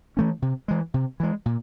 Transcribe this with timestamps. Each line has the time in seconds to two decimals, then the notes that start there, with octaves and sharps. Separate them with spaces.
0.17 E3 A3 C#4
0.42 C3
0.68 E3 G#3
0.94 C3
1.20 E3 G#3
1.46 A#2